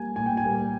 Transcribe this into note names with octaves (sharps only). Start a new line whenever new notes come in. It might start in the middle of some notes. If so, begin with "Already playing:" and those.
Already playing: G3 A#3 G#5
A#2 G#5
G5
G#5
G3 A#3